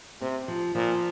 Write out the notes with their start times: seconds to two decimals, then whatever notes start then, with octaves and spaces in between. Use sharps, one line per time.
0.21 C3 C4
0.48 F3
0.75 A#2 F3